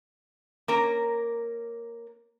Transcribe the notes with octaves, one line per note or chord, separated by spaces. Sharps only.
A#3 C#4 A#4 A#5